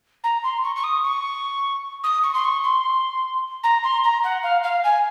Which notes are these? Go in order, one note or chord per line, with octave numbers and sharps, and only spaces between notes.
A#5
C6
C#6
C#6
D#6
C#6
D#6
C#6
C6
C#6
C6
A#5
C6
A#5
F#5
F5
F5
G#5